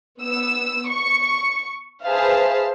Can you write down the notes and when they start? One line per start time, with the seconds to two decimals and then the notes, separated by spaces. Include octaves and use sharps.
0.21 B3 E6
0.90 C#6
2.06 G#4 B4 C5 E5 F5 A5